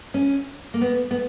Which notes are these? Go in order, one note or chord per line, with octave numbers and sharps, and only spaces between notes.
C#4
A#3
B3
B3